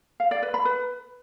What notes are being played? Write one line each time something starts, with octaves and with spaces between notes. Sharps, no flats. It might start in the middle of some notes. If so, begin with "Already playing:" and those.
F5
D5
B4
B5
B4